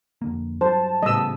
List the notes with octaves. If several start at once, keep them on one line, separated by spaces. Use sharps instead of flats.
F2 D3 A#3
G2 F#3 C5 A5
A1 C#3 G3 B3 D#5 E6